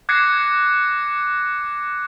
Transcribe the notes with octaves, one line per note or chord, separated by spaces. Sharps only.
D6 F#6 G#6 A#6 C7 C#7